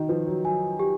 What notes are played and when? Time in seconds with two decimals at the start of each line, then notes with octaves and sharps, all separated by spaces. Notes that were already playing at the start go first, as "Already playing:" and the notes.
Already playing: D#3 F#4
0.09 F3 B4
0.27 F#3
0.45 F#3 G#5
0.80 G4